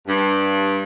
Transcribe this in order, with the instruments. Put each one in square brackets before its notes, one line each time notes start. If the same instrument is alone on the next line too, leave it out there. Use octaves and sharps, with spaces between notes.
[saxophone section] G2